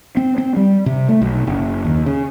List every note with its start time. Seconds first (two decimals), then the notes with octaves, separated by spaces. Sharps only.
0.17 C4
0.38 C4
0.57 G3
0.86 C3
1.09 A3
1.21 B1
1.47 F#1
1.85 D#2
2.06 C#3